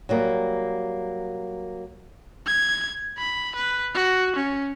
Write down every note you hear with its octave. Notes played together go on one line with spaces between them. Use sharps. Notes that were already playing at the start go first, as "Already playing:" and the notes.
F#3 G3 A#3
G#6
B5
B4
F#4
C#4